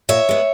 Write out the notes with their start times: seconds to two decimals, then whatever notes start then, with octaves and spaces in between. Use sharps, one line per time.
0.09 A#2 C#5 E5
0.29 G#3 B3